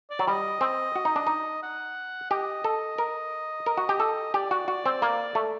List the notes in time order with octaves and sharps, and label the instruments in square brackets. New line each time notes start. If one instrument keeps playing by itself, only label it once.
[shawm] D5
[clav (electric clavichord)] F#3
[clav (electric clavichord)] G3 [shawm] D#5
[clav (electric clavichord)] C4
F#4
D#4
D4
D#4
[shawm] F#5
[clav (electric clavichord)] G4 [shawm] D#5
[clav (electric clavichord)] A4
A#4
A#4
F#4
G4
A4
[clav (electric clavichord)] G4 [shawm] D5
[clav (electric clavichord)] F#4
F#4
C4
A#3
A3